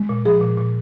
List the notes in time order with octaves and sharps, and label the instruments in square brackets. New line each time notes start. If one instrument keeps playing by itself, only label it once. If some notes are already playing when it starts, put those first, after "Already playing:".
Already playing: [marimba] G#3
A#2
F3 G#4
A#2
A#2